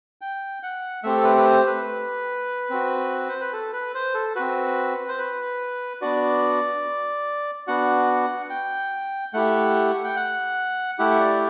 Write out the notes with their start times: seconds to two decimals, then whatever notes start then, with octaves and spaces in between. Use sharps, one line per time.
0.21 G5
0.63 F#5
1.04 A3 C4 G4 E5
1.18 A4
1.24 B4
1.37 B4
1.46 C5
1.66 B4
2.70 C4 F#4
3.29 C5
3.40 B4
3.53 A4
3.73 B4
3.95 C5
4.14 A4
4.36 C4 F#4 B4
5.08 C5
5.18 B4
6.02 B3 D4 F#4 D5
7.67 B3 D4 F#4 F#5
8.50 G5
9.33 A3 E4 G4 F#5
10.04 G5
10.16 F#5
10.99 A3 E4 G4 F#5
11.20 D5